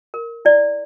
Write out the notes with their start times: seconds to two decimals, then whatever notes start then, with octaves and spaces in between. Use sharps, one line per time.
0.14 A#4
0.45 E4 D5